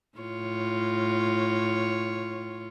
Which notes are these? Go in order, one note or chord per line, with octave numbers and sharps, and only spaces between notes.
A2 F4 C#5